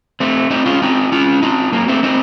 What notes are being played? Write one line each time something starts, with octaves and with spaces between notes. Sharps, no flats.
A3 C4
C4 D#4
C#4 F4
C4 D#4
C#4 F4
C4 D#4
F#3 A#3
A3 C4
C4 D#4